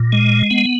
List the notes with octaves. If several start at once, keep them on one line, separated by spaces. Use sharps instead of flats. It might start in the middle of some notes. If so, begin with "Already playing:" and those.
Already playing: A#2
G#3
B3